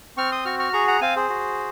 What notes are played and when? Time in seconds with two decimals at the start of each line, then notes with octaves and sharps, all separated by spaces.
0.17 C4 C#6 F6
0.32 C6 D#6
0.45 F#4 C#6 F6
0.59 C#6 F6
0.73 G#4 A#5 C#6
0.88 F#5 A#5
1.01 C4 F5 G#5
1.16 G#4 C5
1.29 F#4